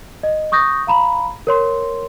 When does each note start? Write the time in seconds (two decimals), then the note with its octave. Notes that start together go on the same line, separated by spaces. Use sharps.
0.23 D#5
0.52 C#6 D#6 G6 A#6
0.87 F5 A#5 B5
1.47 A#4 C#5 C6